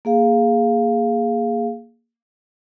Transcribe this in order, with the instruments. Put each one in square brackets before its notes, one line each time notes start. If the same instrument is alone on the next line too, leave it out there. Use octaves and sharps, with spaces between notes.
[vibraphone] A#3 G#4 F5